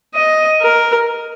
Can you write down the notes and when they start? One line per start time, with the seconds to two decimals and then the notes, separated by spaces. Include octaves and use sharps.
0.15 D#5
0.61 A#4